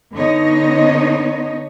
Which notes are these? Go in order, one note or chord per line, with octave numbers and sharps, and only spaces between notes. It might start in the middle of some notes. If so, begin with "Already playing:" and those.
D3 B3 D#4 C#5 D#5